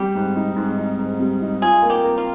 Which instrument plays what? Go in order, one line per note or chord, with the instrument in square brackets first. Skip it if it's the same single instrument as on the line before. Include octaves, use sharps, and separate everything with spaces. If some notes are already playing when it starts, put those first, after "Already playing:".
Already playing: [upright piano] G3 [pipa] G4
[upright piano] G#2
D#4
G#2
D#4
G#2
G3
D#4
[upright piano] F4 [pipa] G#4
[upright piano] A#3
[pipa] G4
[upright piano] A#4
[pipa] F4